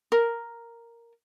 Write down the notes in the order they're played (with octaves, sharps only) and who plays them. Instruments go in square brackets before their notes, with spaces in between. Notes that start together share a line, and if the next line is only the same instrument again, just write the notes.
[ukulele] A#4